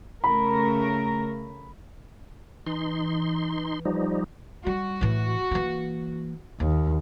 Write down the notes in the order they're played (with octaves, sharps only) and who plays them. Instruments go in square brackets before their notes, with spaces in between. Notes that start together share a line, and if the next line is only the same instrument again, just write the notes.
[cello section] C#3 A3 A#4 [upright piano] B5
[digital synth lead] E3 [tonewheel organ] D#4 C6
[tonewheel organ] F3 G3 D#4
[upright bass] G3 [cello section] F#4
[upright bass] A2 E3
E3 A#3
[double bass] D#2 [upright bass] A#3